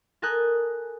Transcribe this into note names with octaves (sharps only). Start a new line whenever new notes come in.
A4 A#4 G#5 D#6 F#6 G6